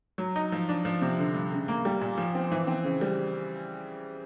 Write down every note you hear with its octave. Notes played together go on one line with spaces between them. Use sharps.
F#3
D#4
F3
D4
F3
C3
D3
G2
C#3
A#3
G3
A#2
F3
C4
E3
C4
C#3
G3